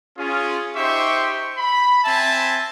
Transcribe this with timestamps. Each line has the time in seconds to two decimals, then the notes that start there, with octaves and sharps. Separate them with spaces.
0.18 C#4 F4 G#4
0.76 D#4 G4 C5 E5 C6 C#6
1.58 B5
2.05 C4 E5 G#5 A5